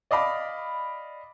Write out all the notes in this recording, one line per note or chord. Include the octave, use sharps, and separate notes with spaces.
D5 D#5 F5 B5 D6